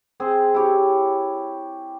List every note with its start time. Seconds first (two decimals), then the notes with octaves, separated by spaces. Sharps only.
0.20 C4 G#4 C5
0.54 E4 G4 C#5